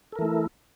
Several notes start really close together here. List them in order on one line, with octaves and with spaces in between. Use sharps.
A4 A#4 E3 A3 E4